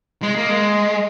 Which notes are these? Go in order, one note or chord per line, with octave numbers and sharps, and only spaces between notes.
G#3
A#3
G#3